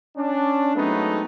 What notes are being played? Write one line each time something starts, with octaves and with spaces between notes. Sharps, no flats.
C#4 D4
F#3 G#3 A3 B3 C4 D#4